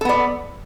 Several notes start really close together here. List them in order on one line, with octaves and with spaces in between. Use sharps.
A4 B3 D5